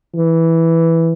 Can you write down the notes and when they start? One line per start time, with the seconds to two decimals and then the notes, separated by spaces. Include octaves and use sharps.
0.14 E3